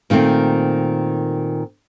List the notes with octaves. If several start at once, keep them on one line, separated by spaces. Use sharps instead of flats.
A#2 D#3 A3 C4